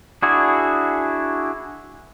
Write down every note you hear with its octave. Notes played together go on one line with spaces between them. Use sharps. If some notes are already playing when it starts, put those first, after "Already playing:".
D4 E4 F#4 G#4